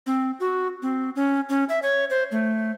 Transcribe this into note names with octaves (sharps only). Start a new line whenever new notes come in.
C4
F#4
C4
C#4
C#4
E5
C#5
C5
A3